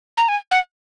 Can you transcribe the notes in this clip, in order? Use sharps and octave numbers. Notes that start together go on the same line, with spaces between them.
A#5
G#5
F#5